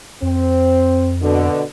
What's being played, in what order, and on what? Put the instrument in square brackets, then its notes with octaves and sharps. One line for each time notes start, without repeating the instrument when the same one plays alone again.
[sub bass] F2 [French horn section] C4
[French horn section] B2 D3